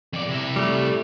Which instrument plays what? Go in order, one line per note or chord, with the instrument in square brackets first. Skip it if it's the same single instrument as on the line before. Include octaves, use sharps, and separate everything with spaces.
[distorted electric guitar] F2 D5
C3 E4
[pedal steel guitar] G3 A3